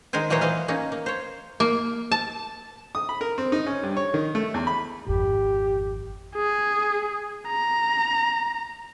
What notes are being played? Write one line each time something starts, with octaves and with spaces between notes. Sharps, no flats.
D#3 G#3 A#4 C5 G#5
A#2 E3 F#3 D#4 C5 C#5
E3 C5 D#5 F5
A#3 C#4 D#4
A#3
C5 C#5
A#3
A5
D#6
B5
A#4
C4
D#4
C#4
G2
C#5
D#3
A3
E2
B5
G#1 F2 G4
G#4
A#5